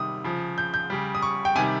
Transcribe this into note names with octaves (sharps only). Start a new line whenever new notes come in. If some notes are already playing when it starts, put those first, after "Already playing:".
Already playing: C3 D#3 G3 D#6
C#3 F3
G6
G6
C#3 G3
D#6
C#6
G5
C3 D#3 G3 G#5